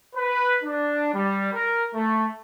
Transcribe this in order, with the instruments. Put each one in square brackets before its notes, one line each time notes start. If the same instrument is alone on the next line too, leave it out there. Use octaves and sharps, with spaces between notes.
[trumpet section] B4
D4
G3
A#4
A3